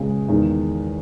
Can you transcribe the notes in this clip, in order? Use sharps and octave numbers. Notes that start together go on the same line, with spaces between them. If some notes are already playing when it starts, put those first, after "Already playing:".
Already playing: C#2 C#3 G#3 C#4
E2 D#3 G#3